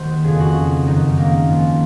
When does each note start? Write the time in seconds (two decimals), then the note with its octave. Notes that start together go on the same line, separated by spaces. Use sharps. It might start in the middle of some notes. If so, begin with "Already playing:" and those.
Already playing: D#2 D#3 F#3 C5
0.24 F2 C#3 F3 G#4
0.40 F#4
0.86 F#2 D#3 F#3 D#4
1.17 A#3
1.48 G#2 F3